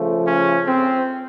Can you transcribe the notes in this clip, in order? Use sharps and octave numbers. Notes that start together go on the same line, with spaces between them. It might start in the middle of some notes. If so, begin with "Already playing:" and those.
Already playing: C#3 F3 A3
C#4
C4